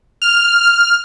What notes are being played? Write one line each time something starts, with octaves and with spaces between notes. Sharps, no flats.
F6